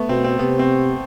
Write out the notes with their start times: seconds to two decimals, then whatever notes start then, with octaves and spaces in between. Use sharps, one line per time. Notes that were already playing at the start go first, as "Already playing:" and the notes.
Already playing: A3 B3
0.09 B2 C4
0.24 C4
0.39 C3 B3
0.59 C4